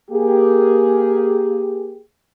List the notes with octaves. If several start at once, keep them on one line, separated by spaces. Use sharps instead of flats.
A#3 G4 G#4